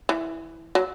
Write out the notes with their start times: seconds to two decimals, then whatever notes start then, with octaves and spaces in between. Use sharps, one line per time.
0.09 E3
0.75 F#3